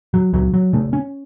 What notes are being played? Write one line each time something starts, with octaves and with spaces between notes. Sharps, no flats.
F#3
C#2 F#3
F#3
C#3 A3
C#4